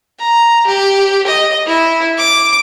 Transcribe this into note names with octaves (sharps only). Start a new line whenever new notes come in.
A#5
G4
D#5
E4
D6